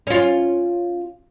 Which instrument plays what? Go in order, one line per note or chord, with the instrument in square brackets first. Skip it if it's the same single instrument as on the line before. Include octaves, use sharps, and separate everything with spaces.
[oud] C#4 F4